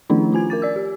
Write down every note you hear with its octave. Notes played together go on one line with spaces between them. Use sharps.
D#3 F3 A3 C#4 D4 E4
C#4 F4 G#5 G#6
A#4 D6 A6
D5 E6
G4